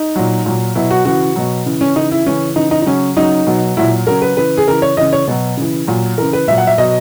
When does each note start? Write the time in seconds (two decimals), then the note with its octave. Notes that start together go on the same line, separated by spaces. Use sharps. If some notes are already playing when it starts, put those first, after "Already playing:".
Already playing: D#4
0.16 A#2 F#3
0.46 A#2 F#3
0.75 B2 F#3 E4
0.91 F#4
1.05 C#3 E3 F#4
1.36 B2 F#3
1.66 C#3 E3
1.81 C#4
1.96 C#3 E3 D#4
2.12 E4
2.26 C#3 E3 C#4
2.56 C#3 E3 D#4
2.71 D#4
2.82 D#4
2.86 C#3 F#3 C#4
3.16 C#3 F#3 D#4
3.47 B2 F#3
3.77 A#2 F#3 E4
4.07 C#3 F#3 A#4
4.22 B4
4.37 C#3 E3 B4
4.57 G#4
4.67 C#3 E3 A#4
4.82 C#5
4.97 C#3 E3 D#5
5.13 C#5
5.28 B2 F#3
5.57 C#3 E3
5.88 A#2 F#3
6.18 C#3 E3 A#4
6.33 B4
6.48 A#2 F#3 E5
6.58 F#5
6.67 E5
6.78 B2 F#3 D#5